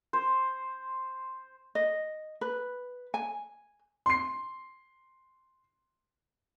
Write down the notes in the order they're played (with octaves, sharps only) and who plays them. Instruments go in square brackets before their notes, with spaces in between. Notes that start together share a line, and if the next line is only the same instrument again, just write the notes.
[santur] C5
[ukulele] D#5
B4
G#5
[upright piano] C6 C7